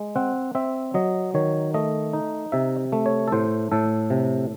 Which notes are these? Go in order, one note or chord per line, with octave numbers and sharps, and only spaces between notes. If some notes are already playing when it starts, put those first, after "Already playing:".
Already playing: G#3
C4 F#5
C4 E5
F#3 D#5
D#3 C#5
A3 D#5
D#4
C3 E5
A3
C#5
A4
A2 C5
A2 A4
C3